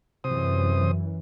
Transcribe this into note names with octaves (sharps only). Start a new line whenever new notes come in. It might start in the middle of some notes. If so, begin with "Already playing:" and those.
F#2 C3 E3 C5 D#6